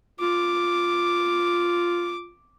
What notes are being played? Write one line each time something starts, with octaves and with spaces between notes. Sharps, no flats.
F4 D6